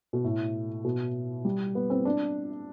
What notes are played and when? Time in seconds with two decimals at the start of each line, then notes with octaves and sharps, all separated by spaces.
0.13 B2
0.24 A2
0.84 B2
1.45 G3
1.75 B3
1.90 C4
2.05 D4